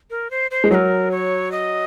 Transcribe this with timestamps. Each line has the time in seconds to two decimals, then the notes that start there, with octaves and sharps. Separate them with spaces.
0.10 A#4
0.31 C5
0.51 C5
0.64 G#3
0.71 F#3 C5
0.74 A#4
1.11 C#5
1.52 D#5